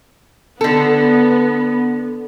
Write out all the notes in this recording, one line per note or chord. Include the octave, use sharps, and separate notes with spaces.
D3 B3 A4